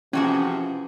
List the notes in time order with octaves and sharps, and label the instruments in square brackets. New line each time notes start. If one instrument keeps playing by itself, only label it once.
[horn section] C3 F3 [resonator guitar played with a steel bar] E3 F#4 G#4 [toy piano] C#4